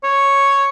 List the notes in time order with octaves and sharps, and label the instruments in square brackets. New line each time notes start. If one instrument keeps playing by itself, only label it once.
[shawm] C#5